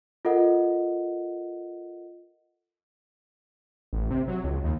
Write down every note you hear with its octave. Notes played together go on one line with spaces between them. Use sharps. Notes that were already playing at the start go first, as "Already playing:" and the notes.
F4 A4 A#4 D#5 F#5
A1
C3
F#3
C#2
D#2